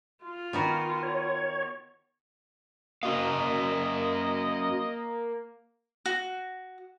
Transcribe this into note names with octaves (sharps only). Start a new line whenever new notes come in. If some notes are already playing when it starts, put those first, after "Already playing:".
F4
D#3 B3 F#4
C#5
A#3 C#4 F#4 D#5 F5
F#4